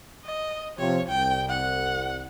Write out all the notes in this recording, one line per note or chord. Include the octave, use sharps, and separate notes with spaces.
D#5
C3 F3 C4 C#5
C2 G5
F#5